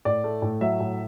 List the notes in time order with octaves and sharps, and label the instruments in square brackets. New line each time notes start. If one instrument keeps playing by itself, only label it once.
[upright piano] A2 D5
A3
A2
F#3 E5
A2